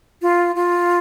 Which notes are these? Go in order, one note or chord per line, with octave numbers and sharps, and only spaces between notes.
F4
F4